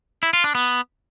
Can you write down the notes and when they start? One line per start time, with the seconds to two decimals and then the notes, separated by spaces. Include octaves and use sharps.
0.23 E4
0.33 F4
0.44 D4
0.55 B3